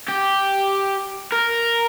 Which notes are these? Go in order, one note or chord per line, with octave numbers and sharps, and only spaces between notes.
G4
A#4